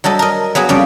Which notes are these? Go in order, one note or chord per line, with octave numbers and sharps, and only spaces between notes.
F#3 G3 A4 D#5
A#4 D#5
F#3 B3 G#4 D#5
F2 C#3 G3 D5